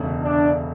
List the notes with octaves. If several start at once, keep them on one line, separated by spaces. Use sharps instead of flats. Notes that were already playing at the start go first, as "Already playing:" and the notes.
Already playing: E1 D2 C#3
D4